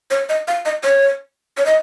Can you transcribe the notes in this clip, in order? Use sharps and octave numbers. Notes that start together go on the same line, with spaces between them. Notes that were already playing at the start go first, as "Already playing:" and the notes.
C#5
D#5
F5
D#5
C#5
C#5
D#5